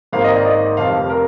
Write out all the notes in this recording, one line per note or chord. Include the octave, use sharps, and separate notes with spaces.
G#1 G#2 D#3 A#3 F5
D#5
D5
D#5
F1 F2 C3 F5
A#4